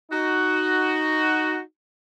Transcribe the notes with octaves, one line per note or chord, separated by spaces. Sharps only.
D#4 F#4